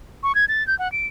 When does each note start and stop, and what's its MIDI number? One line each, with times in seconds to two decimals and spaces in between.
0.23 0.35 85
0.35 0.45 92
0.48 0.66 93
0.67 0.77 91
0.79 0.90 78
0.92 1.07 98